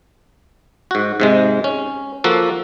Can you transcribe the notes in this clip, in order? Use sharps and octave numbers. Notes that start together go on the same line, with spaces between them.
G#2 F#4
G#2 C3 G#3
C#4
F3 A#3 F#4 A4